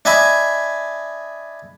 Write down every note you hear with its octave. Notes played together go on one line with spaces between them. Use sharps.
D4 D#5 E5 G#5 B5